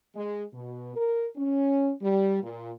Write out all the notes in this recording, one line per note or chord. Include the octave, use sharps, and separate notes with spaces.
G#3
B2
A#4
C#4
G3
A#2